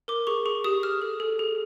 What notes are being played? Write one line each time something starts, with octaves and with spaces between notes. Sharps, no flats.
A#4 D6
G#4 C#6
G#4 C#6
G4 D#6
G4 F6
A4
A4
G#4